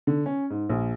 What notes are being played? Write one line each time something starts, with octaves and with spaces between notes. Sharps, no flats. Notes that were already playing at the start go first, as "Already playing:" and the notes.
D3
C#4
G#2
A#1